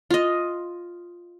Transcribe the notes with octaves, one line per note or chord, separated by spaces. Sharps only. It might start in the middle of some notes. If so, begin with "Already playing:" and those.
F4 D#5